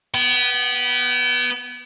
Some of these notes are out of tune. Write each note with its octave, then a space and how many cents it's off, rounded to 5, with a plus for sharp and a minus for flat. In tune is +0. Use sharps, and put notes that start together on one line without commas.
B3 -15 G5 -45